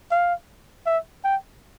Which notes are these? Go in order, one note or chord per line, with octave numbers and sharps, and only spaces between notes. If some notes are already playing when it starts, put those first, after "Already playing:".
F5
E5
G5